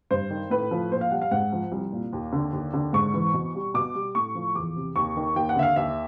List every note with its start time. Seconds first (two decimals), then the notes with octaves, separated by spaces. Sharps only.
0.11 G2 C5
0.30 D#3
0.50 A2 B4
0.71 F3
0.91 A#2 C5
1.01 F5
1.11 G3 F#5
1.22 F5
1.31 G#2 F#5
1.52 F3
1.72 C2
1.92 A#2
2.13 D#2
2.33 D3
2.53 D#2
2.74 D3
2.93 G#2 C#6
3.14 E3
3.34 B2
3.55 G3
3.74 B2 D6
3.95 G3
4.15 A2 C#6
4.35 F3
4.55 E2 D6
4.76 C3
4.96 D#2 C#6
5.17 D#3
5.36 D#2 G5
5.49 F#5
5.56 D3 E5
5.63 F5
5.76 D#2 E5